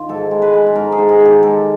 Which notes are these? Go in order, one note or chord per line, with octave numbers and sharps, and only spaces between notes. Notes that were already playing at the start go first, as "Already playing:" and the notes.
Already playing: D#3 F4
G#2 A4
G#3
B4
G#3
A4
G#2 A#4
G#4
G#2
G#4
D#3
G4
G#3 A4